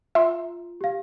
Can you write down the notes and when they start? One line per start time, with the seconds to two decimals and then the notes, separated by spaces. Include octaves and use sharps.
0.15 F4 E5 C6
0.81 G4 F5